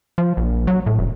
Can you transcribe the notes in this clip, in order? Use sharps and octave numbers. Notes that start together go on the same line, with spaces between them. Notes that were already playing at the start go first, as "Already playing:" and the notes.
F3
A#1
F#3
A2
F1